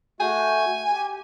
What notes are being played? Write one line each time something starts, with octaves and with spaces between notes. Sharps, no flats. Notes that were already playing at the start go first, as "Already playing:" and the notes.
A3 F#4 G#5 G6
G4